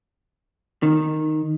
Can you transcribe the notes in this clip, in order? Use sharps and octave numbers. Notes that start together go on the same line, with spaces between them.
D#3